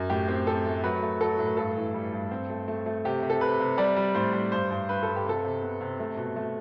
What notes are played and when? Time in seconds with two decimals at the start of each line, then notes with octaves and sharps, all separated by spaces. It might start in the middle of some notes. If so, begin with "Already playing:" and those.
Already playing: F#2
0.10 A2 G4
0.28 C4
0.47 C4 A4
0.66 A3
0.84 F#3 B4
1.03 A3
1.21 F#3 A4
1.39 A2
1.46 B4
1.57 G2 A4
1.76 E3
1.94 G3
2.13 G2
2.31 C4
2.50 A3
2.68 A3
2.86 A3
3.05 C3 G4
3.23 C3
3.30 A4
3.41 C3 B4
3.60 C3
3.78 G3 D5
3.96 G3
4.15 A2 C5
4.33 G3
4.52 G2 C5
4.70 G2
4.89 G2 B4
5.03 G2 A4
5.16 G4
5.25 C3 A4
5.45 C3
5.62 B3
5.81 C3
6.00 A3
6.17 B2
6.36 A3